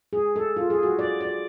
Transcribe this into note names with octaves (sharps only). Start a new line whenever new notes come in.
G#4
A4
F4
G#4
F#4
D5
D5